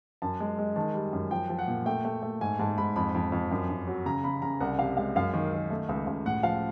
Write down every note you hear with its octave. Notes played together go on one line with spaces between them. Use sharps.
F#2 A5
G#3
G#3
D#3 A5
G3
F#2
F3 G5
F3
F#5
A#2
A3 G5
A3
A3
G#2 G#5
G#2 A5
G#2 B5
F2 B5
F2
F2
F#2
F#2
F#3
C#3 A#5
C#3 B5
C#3 A#5
C2 F#5
C3 F5
G#3 F5
F#2 F5
D#3
D#3
A3
C#2
C#2
A2 F#5
F3 F5